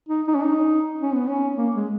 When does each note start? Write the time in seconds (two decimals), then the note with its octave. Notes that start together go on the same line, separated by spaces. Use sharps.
0.09 D#4
0.28 D#4
0.35 C#4
0.43 D#4
1.01 C#4
1.14 B3
1.28 C#4
1.57 A#3
1.75 G#3